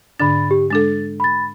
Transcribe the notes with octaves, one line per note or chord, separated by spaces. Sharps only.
G#2 D3 D4 B5 A6
G4
G#3 D4 A4 A6
B5 A6